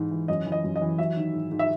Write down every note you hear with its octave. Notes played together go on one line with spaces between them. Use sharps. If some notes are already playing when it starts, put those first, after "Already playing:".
Already playing: G#2 E3
E3
F#2 D#5
E3
D#5
F#2
D#5
E3
F#3 E5
D#3
G#2
G#2
E5